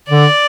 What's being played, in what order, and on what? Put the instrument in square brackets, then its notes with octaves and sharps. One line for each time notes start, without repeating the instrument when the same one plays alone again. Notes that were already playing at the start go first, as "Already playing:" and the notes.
[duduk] D3 [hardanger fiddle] D5